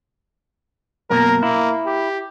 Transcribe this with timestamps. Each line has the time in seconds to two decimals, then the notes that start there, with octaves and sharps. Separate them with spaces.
1.10 F#2 B2 A#3 A#4
1.43 A#3 E4
1.86 G4